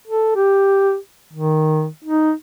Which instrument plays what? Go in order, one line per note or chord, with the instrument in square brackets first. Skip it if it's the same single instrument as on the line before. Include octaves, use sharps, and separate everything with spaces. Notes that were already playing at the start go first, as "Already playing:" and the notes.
[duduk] A4
G4
D#3
D#4